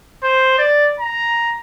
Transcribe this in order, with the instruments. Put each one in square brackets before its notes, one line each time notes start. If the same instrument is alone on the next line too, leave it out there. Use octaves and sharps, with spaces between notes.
[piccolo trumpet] C5
D5
A#5